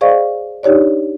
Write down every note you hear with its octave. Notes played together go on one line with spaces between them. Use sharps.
G#4 C5 D5 D#5 F5 C#6
D4 D#4 G4 C#5 D5